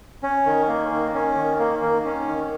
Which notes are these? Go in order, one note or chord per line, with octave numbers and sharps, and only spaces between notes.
C#4
D#3
A#3
D#3
C#4
D#3
A#3
D#3
C#4
D#3